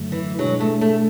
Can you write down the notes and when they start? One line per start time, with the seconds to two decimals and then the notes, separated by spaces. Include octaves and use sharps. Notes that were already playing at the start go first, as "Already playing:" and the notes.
Already playing: F#2 D3 F#3 A3
0.12 E3
0.39 B2 F#3 G#3 D4 G#4
0.60 A3
0.81 A3